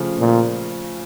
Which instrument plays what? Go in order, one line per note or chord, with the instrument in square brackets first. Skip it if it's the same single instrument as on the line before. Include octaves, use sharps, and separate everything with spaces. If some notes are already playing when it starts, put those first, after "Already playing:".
Already playing: [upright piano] C#3 F3 A3
[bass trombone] A#2